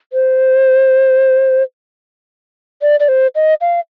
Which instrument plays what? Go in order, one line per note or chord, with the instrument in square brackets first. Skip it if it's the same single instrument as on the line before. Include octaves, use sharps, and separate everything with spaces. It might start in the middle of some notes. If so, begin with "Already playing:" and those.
[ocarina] C5
D5
D5
C5
D#5
F5